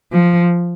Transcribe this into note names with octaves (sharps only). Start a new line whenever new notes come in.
F3